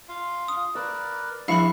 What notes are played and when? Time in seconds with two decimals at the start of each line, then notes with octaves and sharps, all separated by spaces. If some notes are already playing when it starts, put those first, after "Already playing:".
0.09 F4 F5
0.48 D#6
0.75 A#4 B4 D5 E6
1.48 A#1 E4 E5 F5 B5 C#6